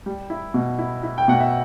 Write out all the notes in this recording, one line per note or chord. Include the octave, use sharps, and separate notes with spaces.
G3
E4
B2
E4
E4
G5
B2 F#5
E5